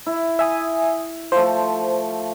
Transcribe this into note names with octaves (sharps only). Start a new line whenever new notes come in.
E4
E5 G#5 D#6
F3 A3 C5